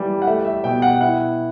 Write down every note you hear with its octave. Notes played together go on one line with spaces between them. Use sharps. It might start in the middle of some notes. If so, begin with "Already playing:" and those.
Already playing: E3 G3
F#5
A3 E5
E5
B2 G5
F#5
E4 F#5